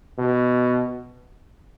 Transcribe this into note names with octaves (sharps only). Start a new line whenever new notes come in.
B2